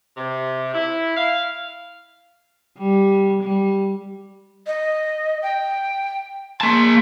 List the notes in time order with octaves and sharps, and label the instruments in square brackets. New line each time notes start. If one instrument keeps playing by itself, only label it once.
[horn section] C3
E4
F5
[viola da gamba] G3
G3
[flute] D#5
G5
[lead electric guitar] A#3 A5 [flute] C6